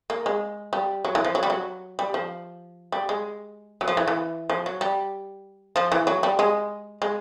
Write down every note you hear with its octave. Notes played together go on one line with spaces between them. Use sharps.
A#3
G#3
G3
F#3
E3
F3
F#3
G3
F#3
G3
F3
G3
G#3
F#3
F3
E3
E3
F3
F#3
G3
F3
E3
F#3
G3
G#3
G#3